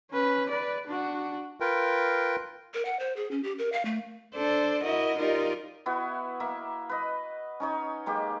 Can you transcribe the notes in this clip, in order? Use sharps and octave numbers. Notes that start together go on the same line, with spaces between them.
C#4 B4
B4 D5
D4 F#4
F4 A#4 B4 G5
A#4
F#5
C5
G#4
C#4
G4
A#4
F5
A3
D4 A4 C5 D5
E4 F#4 A#4 D#5
D#4 F4 G4 A#4 D5 D#5
B3 E4 F#4
A#3 E5
B4 D#5
C#4 D#4 C#5
G#3 A#3 G4